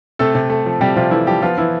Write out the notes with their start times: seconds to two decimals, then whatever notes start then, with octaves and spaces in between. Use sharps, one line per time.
0.19 C3 A3 A4
0.35 C3
0.50 A3
0.66 F3
0.81 C3 G3 G4
0.96 C3 F3 F4
1.11 E3 A3 E4
1.26 F3 G3 G4
1.42 F3 B3 F4
1.58 E3 E4